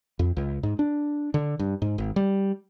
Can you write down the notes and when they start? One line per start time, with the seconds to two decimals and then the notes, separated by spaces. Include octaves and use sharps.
0.19 F2
0.37 C#2
0.63 G#2
0.79 D4
1.34 D3
1.59 G2
1.82 G#2
1.98 G#1
2.16 G3